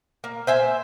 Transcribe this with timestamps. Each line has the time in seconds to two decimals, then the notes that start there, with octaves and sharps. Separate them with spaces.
0.24 A#3
0.47 C5 E5 G#5